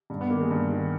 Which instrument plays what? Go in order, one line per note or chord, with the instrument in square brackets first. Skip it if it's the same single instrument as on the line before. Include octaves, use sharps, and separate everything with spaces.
[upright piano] G2
B3
D#3 A#3
G#3
G2
D#3